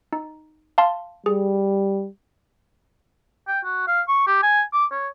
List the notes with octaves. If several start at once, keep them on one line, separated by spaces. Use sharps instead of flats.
D#4
F5 A5 C6
G3 G#4
G5
F#4
F5
C#6
G4
G#5
D6
C#5